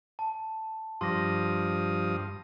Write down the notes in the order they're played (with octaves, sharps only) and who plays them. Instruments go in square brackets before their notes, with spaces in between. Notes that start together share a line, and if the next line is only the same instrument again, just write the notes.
[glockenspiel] A5
[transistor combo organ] G2 F3 D#6 [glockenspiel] C6 D6 A#6